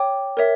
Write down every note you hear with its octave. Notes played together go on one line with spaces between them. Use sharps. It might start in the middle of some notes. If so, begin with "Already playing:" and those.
Already playing: C#5 G5 D6
A#4 C#5 E5